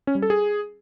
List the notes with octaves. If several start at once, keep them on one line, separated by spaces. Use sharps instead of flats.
C#4
G3
A4
G#4